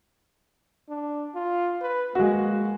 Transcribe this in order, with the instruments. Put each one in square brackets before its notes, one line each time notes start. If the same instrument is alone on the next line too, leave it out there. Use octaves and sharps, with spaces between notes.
[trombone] D4
F4
B4
[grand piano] G#3 F#4 [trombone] A#3